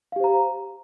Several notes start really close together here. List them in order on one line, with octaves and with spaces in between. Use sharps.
F5 G4 C5 A#5